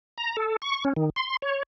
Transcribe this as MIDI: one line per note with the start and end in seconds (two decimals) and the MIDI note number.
0.18 0.36 82
0.37 0.56 69
0.62 0.84 85
0.85 0.93 61
0.96 1.10 51
1.16 1.37 84
1.42 1.63 73